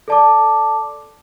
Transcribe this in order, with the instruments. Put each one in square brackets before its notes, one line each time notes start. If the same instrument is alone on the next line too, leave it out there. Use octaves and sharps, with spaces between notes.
[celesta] A4 D5 A5 D6